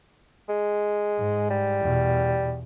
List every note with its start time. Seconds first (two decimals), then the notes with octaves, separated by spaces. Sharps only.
0.49 G#3
1.17 G#2
1.50 G3
1.81 E2 B2